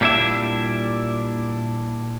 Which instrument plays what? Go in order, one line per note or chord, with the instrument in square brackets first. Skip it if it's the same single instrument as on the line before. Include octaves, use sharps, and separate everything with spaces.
[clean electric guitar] A#2 G3 C#4 D4 E4 E5